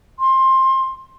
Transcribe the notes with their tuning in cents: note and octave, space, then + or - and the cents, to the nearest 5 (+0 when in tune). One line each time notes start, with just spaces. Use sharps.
C6 +20